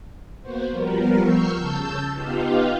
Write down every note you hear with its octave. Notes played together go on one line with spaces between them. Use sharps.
A#3 B3 F#4 C5
F3 G3 B3 A#4
C#6 E6 F6 G6 C7
C#3 A5 E6 G6
B3 D#4 F4 G4 F5